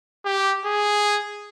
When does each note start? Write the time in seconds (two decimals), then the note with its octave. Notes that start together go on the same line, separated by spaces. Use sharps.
0.25 G4
0.65 G#4